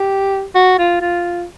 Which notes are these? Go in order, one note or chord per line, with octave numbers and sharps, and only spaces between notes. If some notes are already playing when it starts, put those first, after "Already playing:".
Already playing: G4
F#4
F4
F4